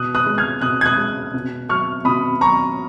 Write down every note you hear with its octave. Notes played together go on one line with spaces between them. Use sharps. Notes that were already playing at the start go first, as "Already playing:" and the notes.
Already playing: B2 D#6 F#6
D#6 F#6
G#3
F6 G#6
B2 D#6 F#6
G#6
D#6 F#6
G#3
B2
F#3 C#6 F6
B2 B5 D#6
F#3 A#5 C#6